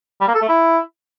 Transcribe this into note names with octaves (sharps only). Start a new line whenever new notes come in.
G3
A#3
A4
A3
E4